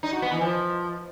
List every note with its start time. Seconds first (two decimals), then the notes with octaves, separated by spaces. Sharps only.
0.03 D#4
0.13 F#4
0.22 B3
0.32 E3
0.41 F3